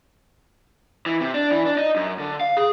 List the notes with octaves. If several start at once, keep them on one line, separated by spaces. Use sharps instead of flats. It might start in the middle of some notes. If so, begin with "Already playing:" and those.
E3
C3
D4
E3
D4
D#4
F#2
D3
F5
G#4